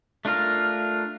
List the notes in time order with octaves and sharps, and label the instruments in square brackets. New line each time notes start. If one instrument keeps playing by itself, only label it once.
[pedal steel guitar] A3 D4 F4 A#4